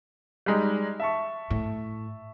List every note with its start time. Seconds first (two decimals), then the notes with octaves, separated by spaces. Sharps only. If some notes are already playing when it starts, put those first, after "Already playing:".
0.46 G3 G#3 D#4
1.00 E5 A5 C#6
1.50 A2